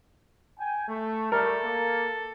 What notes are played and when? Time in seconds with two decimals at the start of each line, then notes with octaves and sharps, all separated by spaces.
0.59 G5 G#5
0.88 A3
1.32 G3 A3 A4 A#4
1.64 A#3